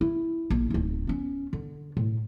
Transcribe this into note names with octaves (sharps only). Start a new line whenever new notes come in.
E4
A#1
D1 D#4
B3 C#4
D3
A2